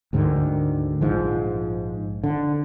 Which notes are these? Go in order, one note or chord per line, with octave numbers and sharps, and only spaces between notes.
D2 G#2 D3 D#3
A#1 G#2 F3
D3